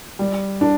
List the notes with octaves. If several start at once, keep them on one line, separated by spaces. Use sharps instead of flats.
G3
D4